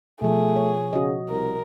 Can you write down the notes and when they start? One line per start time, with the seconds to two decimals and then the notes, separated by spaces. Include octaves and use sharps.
0.22 B2 F3 A3 G#4
0.56 C#5
0.93 C#3 F#4 D#5
1.30 C2 A#4